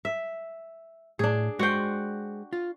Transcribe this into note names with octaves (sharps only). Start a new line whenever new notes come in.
E5
A2 D4 G#4
G#3 F#4 C5 F#5 G5
F4